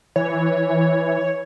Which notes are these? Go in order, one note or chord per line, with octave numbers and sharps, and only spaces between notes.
E3 C#5